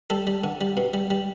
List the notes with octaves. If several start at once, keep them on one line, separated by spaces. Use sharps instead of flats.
G3 A4
G3
D3
G3
B2
G3
G3